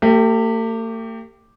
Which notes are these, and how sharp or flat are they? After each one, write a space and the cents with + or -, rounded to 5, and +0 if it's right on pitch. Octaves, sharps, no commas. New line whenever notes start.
A3 +45 G4 +0